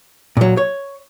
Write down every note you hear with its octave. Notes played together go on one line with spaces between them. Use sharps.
A#2 F#3
C#5